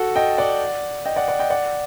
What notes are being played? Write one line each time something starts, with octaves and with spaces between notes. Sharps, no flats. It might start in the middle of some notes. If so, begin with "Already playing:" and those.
Already playing: F#4 A4
D#5 G5
D5 F#5
D#5 G5
D5 F#5
D5 F#5
D#5 G5
D5 F#5